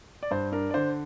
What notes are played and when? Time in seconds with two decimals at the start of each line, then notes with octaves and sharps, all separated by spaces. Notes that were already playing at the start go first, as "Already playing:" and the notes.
0.23 D5
0.31 G2 C5
0.52 D4 A#4
0.70 D5
0.74 D3 C5